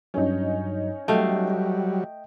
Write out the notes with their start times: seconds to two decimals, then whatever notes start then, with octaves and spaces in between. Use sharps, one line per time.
0.14 G2 F#3 C#4 D#4
1.08 F#3 G3 A3 D#5 F5 G5